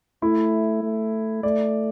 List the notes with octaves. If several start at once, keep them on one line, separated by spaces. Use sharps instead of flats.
A3 E4
A3
A3 D5